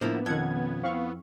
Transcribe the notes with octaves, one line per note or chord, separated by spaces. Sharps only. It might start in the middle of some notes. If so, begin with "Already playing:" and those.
A2 F3 A#3 B3 D4 E4
F2 B2 D#3 C#4 F4 F#5 G#6
C4 E4 F5 C#6